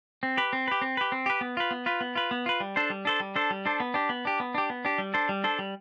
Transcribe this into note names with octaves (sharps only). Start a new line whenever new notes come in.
C4
G4 B4
C4
G4 B4
C4
G4 B4
C4
G4 B4
B3
F4 B4
B3
F4 B4
B3
F4 B4
B3
F4 B4
G3
D4 A4 C5
G3
D4 A4 C5
G3
D4 A4 C5
G3
D4 A4 C5
B3
D4 G4
B3
D4 G4
B3
D4 G4
B3
D4 G4
G3
D4 A4 C5
G3
D4 A4 C5
G3